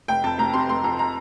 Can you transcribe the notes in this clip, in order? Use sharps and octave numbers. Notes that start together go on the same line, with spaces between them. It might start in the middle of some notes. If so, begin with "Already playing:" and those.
F1 G5
F2 A5
F1 A#5
C3 C6
F1 C6
F2 A#5
A#5